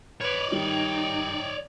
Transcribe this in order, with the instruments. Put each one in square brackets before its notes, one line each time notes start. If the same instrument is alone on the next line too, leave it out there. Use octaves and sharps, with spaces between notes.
[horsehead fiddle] B4 [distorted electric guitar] C#5 D5
[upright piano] D#3 G3 [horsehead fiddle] D#4 G5